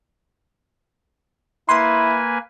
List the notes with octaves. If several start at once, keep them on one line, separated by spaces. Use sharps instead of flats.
A#3 E4 B4 G#5 C6